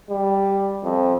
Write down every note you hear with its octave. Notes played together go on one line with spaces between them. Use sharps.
G3
F2